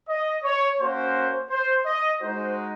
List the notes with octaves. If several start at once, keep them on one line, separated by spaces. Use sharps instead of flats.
D#5
C#5
A#3 C#4 F#4 C5
C5
D#5
G#3 D#4 F#4 C5